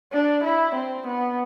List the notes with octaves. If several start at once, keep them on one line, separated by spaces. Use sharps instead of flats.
D4
E4
C4
B3